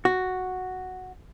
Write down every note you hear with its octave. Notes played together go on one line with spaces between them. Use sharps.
F#4